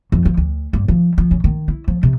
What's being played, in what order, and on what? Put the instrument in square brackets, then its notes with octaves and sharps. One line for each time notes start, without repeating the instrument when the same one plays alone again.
[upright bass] F2
F3
D2
G2
F3
F3
C#3
D#3
E4
F3
C3